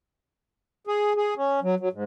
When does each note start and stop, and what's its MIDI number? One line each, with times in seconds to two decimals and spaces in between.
0.87 1.13 68
1.16 1.34 68
1.36 1.60 61
1.62 1.75 54
1.80 1.89 54
1.93 2.04 44